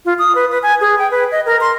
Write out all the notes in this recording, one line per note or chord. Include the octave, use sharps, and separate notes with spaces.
F4
D#6
B4
B4
G#5
G#4
G5
B4
D#5
A#4
C6